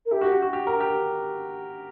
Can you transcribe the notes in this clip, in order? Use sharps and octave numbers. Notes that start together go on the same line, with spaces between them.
A#4
E4 G4
F#4
F#4
F#4
G4
A#4
G4